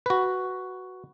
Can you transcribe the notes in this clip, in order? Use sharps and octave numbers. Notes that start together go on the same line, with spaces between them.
F#4 B4